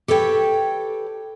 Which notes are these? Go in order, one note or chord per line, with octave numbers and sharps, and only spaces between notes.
G4 A4 B4 C#5 G5